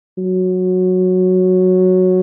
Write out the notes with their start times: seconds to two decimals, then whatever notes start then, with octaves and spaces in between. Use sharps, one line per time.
0.18 F#3